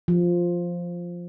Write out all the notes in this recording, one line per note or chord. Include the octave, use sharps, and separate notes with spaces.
F3